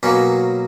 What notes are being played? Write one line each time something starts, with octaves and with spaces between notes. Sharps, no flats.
B2 F#3 A#3 C#4